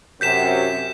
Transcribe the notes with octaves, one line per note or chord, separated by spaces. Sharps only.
F#2 C3 G6 B6 E7